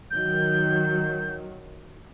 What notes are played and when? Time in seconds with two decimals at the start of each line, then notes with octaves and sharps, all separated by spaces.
0.11 D#3 F#3 G6